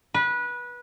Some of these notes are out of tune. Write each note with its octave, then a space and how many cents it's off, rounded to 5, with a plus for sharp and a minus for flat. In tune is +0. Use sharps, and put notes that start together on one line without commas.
B4 -20